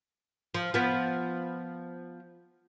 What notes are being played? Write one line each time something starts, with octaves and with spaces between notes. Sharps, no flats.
F3
F3 B3